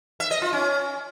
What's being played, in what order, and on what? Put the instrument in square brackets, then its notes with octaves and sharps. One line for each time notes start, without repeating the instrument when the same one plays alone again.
[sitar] E5
D#5
F4
C#4